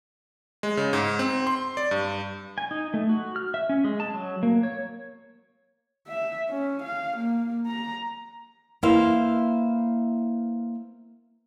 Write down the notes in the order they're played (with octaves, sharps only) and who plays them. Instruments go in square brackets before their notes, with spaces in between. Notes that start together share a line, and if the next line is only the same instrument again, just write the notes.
[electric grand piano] G#3
C#3
G#2
C4
C6
D5
G2
[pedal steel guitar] G#5
D#4
A3
F#4
F6
E5
C#4
G#3
A5
F#3
A#3
C#5
[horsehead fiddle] E5
C#4
F5
A#3
A#5
[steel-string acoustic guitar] A#3 E4 B4 C5 E5 F5